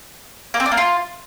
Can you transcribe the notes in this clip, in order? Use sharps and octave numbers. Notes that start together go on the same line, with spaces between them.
A#3
C4
D4
A#3
F4